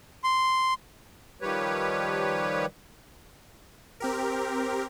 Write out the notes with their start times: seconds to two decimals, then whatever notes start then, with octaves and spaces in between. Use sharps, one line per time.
0.24 C6
1.41 D#3 F3 G3 G4 B4 C#5
4.00 C4 G4 A#4